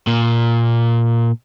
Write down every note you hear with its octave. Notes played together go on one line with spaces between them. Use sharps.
A#2